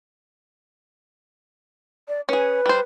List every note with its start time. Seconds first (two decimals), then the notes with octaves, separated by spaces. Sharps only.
2.08 D5
2.29 C#4 G#4 B4
2.66 G3 C5